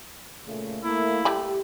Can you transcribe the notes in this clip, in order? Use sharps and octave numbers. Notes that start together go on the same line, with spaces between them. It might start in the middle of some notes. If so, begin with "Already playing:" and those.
A#2 C#3 A3
A3 A#3 E4
G3 A3 G4 B5